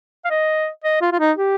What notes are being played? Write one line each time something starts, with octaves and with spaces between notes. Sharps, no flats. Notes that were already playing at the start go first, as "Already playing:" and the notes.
F5
D#5
D#5
F4
F4
D#4
G4